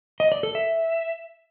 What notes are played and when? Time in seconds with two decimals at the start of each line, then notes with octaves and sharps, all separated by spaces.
0.20 D#5
0.32 D5
0.43 A4
0.55 E5